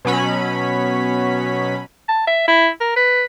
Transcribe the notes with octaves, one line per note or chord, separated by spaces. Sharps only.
B2 F#3 C#4 B5
A5
E5
E4
A#4
B4